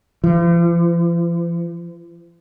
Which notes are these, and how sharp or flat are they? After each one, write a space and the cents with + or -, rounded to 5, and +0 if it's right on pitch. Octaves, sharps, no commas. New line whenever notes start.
F3 -45